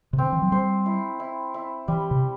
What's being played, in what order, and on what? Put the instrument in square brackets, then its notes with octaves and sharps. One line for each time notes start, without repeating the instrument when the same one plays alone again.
[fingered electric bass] C3
[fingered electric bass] D3 [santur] C4
[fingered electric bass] E3
F#3
[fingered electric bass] G3 [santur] C5
[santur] E4
E4
E4
[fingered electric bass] E3 [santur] G3
[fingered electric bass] C3